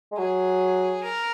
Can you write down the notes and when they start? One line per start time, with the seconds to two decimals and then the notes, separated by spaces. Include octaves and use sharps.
0.12 G#3
0.18 F#3 G#4
1.03 A#4